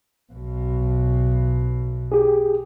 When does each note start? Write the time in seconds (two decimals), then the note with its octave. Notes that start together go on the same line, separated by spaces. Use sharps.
0.33 B1 B2
2.12 G4 G#4